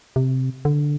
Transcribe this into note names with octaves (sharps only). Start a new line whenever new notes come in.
C3
D3